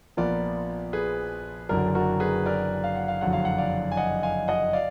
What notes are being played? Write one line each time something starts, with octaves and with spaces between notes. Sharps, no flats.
A#1 A#2 F3 B3 A#4 D5
G#4 B4
F#1 F#2 D3 F#3 A#4 D5
F#4 A#4
G#4 B4
A#4 D5
F5
F#5
F5
F#1 F2 D3 F#3 F#5
F5
F#5
D5 F5
G#5
D#5 F#5
F5 G#5
D#5 F#5
D5 F5